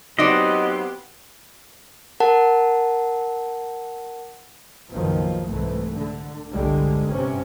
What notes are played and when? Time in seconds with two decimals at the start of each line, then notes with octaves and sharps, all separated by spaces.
0.19 F#3 B3 C4 D#4 G4 D5 D#5
2.20 A#4 F#5 A5
4.91 F#1 B1 B2 D#3 F3
5.46 C2 G#2 E3 A3
5.95 D3
6.51 G1 C2 D3 G3 G#3
7.07 G2 C3 C#4